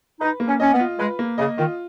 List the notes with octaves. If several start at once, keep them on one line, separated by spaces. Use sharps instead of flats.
D#4 B4
A#3
C#4
C#4 D#5
B3
F4
G#3 B4
A#3
C#3 D#5
D#3 F4